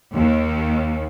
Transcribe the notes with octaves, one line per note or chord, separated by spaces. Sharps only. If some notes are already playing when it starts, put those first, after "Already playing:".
D#2